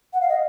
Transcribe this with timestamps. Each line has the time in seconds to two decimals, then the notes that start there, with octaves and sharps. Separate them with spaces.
0.13 F#5
0.21 F5
0.29 D#5